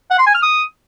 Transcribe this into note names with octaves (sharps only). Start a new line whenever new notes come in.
F#5
C6
G#5
F6
D#6